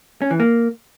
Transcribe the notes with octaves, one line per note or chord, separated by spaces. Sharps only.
C#4
E3
A#3